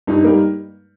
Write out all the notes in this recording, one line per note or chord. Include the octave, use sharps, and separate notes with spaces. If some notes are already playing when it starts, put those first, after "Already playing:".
G2 D#4
G3 A#3